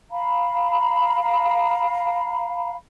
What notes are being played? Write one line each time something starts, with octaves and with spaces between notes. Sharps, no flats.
F5 A#5 B5